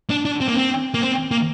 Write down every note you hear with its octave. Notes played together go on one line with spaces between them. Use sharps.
D4
D4
C4
A#3
C4
A#3
C4
A#3